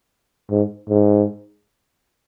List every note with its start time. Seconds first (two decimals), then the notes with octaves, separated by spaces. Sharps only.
0.50 G#2
0.89 G#2